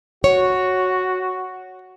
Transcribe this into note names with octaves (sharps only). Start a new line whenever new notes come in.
F#4 C#5